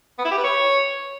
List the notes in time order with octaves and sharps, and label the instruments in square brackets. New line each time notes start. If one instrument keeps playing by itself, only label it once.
[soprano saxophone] B3
E4
G4
B4
C#5